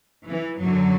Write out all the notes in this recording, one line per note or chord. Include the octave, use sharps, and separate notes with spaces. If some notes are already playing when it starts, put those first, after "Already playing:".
E3
F#2 D3 F#3